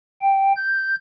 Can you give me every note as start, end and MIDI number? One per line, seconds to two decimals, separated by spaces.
0.21 0.53 79
0.56 0.95 91